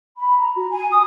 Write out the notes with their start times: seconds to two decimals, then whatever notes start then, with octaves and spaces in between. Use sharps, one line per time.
0.18 B5
0.37 A#5
0.54 F#4
0.71 G#5
0.90 D#6